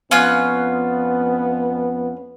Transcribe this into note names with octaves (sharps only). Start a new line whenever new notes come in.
F2 B3 C#4 F4 F#6